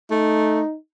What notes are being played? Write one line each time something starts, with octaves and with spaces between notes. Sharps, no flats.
A3 D#4